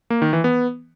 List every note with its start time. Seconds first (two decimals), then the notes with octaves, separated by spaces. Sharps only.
0.10 A#3
0.22 D#3
0.33 E3
0.44 B3